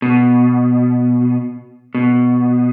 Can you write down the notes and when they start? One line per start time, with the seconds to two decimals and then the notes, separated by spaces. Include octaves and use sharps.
0.02 B2
1.95 B2